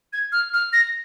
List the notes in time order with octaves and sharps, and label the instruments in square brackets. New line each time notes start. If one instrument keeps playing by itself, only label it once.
[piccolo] G#6
F6
F6
A#6